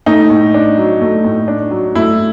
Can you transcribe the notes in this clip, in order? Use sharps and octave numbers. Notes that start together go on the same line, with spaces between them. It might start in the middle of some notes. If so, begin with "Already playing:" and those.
A3 D#4
A2
D4
F#3
A3
A2
D4
F#3
A3 E4